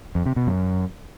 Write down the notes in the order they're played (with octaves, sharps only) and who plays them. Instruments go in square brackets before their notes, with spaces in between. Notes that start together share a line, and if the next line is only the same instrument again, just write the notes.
[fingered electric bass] F2
C3
B2
F#2